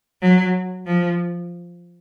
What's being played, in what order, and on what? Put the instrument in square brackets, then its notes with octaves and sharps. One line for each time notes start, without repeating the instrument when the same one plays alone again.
[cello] F#3
F3